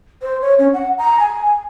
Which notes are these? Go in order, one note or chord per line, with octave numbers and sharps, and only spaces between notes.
C5
C#5
C#4
F#5
A#5
G#5